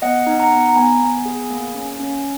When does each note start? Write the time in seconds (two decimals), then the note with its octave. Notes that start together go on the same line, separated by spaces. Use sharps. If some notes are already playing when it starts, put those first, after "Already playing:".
0.02 B3 D#5 F#5
0.27 D#4
0.39 F#5 A#5
0.52 B3
0.69 A#5
0.76 B3 G#5 B5
1.01 B3
1.25 G#4
1.50 A#3
1.75 C#4
1.99 C#4